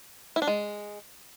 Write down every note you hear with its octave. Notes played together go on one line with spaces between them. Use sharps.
E4
D4
G#3